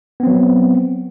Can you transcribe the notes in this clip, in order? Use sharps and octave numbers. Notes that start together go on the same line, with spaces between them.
F#3 B3 C4